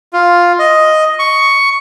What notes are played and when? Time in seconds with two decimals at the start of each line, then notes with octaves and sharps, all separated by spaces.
0.13 F4
0.59 D#5
1.19 C#6